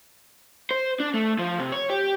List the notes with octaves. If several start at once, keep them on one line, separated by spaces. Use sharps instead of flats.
C5
D4
A3
F3
C3
C#5
G4